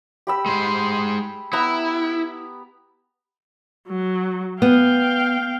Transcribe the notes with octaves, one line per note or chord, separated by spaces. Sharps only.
G4 B5 E6
G#3 C5
B3 E4 A#5
F#3
B3 F5 G5